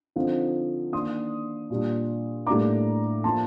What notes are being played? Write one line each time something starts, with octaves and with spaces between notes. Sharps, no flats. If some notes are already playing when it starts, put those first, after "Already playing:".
D3 F3 C4 D#4
D#3 A#3 D4 C6 D#6
A#2 G3 D4
A2 G3 A#3 D4 A#5 D6
F3 A#3 D4 A5 C6